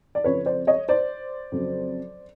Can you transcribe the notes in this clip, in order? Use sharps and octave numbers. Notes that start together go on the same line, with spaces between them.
D5
F2 C#3 F3 B4 C#5
C5 D5
C#5 D#5
C5 D5
F2 C#3 F#3